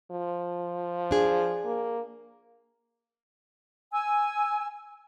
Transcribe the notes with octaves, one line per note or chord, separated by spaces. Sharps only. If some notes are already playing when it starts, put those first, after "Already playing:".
F3
D4 G#4
A#3
G#5 E6